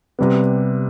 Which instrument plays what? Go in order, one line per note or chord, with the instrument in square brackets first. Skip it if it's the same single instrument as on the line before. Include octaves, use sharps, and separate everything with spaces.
[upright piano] C3 G3 B3